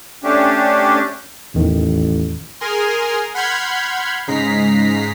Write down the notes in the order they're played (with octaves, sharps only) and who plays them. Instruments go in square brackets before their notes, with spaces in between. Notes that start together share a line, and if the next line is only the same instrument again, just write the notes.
[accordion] A3 C#4 D4 G4
[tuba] A1 [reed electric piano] E2 D#3
[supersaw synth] G#4 A#4 G#5 A#5 C6
F#5 B5 C6 F6 G6 G#6
G#2 C#3 G#3 A#5 B6 C7